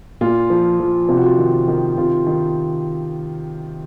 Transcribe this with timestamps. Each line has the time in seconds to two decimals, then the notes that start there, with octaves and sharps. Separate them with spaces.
0.21 A#2 F4
0.50 F3
0.80 F3
1.09 C3 F4
1.17 F#4
1.25 F4
1.38 D#3
1.68 D#3
1.97 C3 F4
2.27 D#3